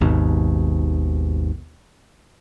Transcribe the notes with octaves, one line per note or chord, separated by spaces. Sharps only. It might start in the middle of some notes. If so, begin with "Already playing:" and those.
G#1 D#2 G#2 B2